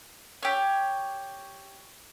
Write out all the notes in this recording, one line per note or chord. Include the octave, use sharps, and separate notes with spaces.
G4 C#5